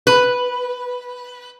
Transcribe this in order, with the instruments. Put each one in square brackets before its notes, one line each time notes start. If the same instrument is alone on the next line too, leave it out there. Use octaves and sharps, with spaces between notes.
[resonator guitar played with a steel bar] B4